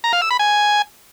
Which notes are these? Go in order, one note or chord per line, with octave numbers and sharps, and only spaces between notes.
A#5
F5
E6
B5
G#5